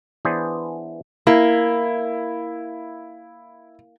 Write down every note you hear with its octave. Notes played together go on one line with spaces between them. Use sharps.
E3 B3 D4 G#4 C5 D5
A#3 E4